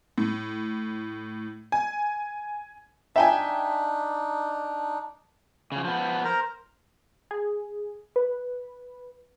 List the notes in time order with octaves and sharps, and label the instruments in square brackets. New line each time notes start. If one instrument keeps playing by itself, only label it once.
[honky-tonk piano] A2
G#5
[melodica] D4 D#4 [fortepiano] E5 G5 G#5
[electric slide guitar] C#3 F3
F3 B3
[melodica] A#4 C5 A#5
[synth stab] G#4
B4